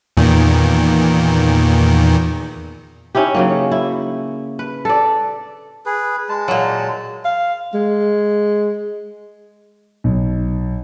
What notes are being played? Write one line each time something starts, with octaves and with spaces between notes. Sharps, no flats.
E2 A#2 D#3
C#4 D#4 E4 G4
C#3 F#3 A#3
E4
B4
A4 D5
G#4 B4
G#3 A5
A#2 F#3
F5
G#3
B1